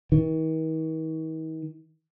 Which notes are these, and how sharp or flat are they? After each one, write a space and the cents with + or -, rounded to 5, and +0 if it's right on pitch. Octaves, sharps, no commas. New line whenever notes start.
D#3 +45